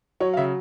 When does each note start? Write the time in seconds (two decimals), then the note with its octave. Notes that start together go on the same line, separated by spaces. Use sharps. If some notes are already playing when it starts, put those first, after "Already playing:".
0.20 F#3 C#5
0.34 F5
0.37 C#3 E5